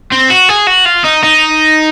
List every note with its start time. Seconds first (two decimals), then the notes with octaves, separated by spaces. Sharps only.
0.12 C4
0.30 F#4
0.49 G#4
0.67 F#4
0.85 F4
1.04 D#4
1.23 D#4